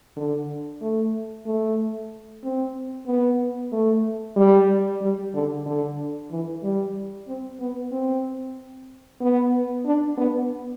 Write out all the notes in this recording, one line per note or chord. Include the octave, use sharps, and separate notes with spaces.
D3
A3
A3
C4
B3
A3
G3
G3
D3
D3
E3
G3
C4
B3
C4
B3
D4
B3